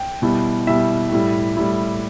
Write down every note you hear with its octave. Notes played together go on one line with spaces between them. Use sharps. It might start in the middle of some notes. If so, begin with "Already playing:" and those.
Already playing: G5
B2 G3 E4
B2 G3 E4 E5
A2 G3 E4
A2 G3 E4